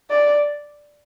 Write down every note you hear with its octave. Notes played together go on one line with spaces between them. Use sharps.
D5